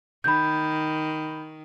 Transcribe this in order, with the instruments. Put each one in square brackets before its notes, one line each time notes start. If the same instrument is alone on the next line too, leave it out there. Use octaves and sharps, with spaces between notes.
[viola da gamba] D#3 [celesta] B5 G6